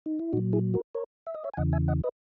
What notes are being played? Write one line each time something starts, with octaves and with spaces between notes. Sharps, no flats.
D#4
E4
A#2 F#3 D#4 F#4
E4 G#4
F#4 A#4
A#4 C#5
E5
D#5
C#5 E5
G#5
E2 C#3 E3 D#5 F#5
E5 G#5
D#5 F#5
B4 D#5